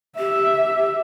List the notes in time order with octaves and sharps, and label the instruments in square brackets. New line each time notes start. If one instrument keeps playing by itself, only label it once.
[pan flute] G4 [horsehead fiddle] E5